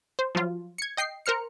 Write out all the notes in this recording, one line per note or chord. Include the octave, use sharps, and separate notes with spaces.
C5
F3 F#3 F4
G#6 C#7
D#5 G5 C7
A#4 C5 F6 C#7